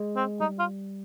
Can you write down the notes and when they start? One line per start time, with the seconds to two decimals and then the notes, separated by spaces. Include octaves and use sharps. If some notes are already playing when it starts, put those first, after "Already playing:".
Already playing: G#3
0.16 C4
0.40 G3 D#4
0.59 F4